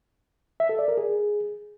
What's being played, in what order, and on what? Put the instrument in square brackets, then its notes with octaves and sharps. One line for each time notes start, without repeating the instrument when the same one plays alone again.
[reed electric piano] E5
A4
D5
A#4
G#4